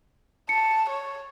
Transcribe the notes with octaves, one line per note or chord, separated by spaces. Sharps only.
A5 C#7
C#5